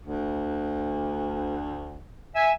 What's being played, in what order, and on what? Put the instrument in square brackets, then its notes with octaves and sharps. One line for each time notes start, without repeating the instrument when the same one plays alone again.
[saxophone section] D2
[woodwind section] E5 G#5